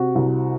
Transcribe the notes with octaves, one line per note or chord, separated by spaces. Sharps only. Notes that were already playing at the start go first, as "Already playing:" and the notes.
Already playing: C3 F#4
C2